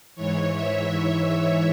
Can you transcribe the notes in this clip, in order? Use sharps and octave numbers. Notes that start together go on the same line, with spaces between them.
G#2 E3 C#5
E5
E5